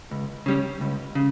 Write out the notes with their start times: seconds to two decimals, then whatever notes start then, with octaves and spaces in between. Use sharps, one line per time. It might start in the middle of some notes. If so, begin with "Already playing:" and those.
0.11 C#2
0.46 C#3 G3 C#4
0.81 C#2
1.15 C#3